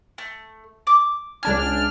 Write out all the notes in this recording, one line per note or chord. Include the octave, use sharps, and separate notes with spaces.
A3
D6
C#2 D4 G#5 F6